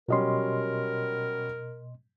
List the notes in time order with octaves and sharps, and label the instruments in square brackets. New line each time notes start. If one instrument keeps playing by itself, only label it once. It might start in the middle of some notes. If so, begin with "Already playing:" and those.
[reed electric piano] B2 D#5 C6 [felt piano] F#3 G3 C#4 [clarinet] A#4